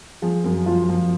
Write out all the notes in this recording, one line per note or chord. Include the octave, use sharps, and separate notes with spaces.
F3 G#4
F#2
F3 F4
F3